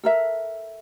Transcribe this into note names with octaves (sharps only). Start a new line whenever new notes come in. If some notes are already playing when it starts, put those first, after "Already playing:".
A4 A#4 E5